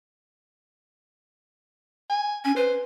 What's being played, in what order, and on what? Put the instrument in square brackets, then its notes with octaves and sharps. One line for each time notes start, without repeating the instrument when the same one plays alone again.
[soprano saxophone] G#5
[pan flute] C#4 [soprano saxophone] G#5
[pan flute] B4 [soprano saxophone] C5